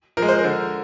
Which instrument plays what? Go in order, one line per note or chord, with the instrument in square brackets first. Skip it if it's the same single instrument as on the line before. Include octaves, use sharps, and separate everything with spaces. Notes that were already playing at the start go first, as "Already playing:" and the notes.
[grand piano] F3 A#4
G#3
C5
A#4
D3